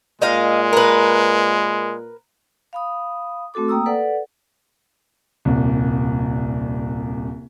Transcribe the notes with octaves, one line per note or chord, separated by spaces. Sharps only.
A#2 G#3 D#4 D#5 F5
A#4 B4
F5 B5 D#6
A3 C4 F#4 A4 D6
A#3 G5 A#5 D#6 E6
A4 B4 D5 F#5
D#1 C2